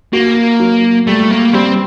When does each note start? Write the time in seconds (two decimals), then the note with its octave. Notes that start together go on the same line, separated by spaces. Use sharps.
0.13 A#3 F#4
0.60 F#3
1.07 G3 A3
1.31 A#3
1.53 G3 C4